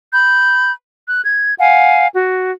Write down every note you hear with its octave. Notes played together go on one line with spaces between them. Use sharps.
B5 G6
F#6
G#6
F5 F#5 G#5
F#4